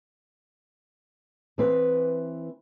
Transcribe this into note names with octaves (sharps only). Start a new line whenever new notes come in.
E3 C4 B4